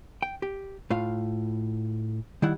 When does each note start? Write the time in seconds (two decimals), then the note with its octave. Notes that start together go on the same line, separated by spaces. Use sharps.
0.22 G5
0.42 G4
0.90 A2 F4 F5
2.42 D#3 G3 E4 F#5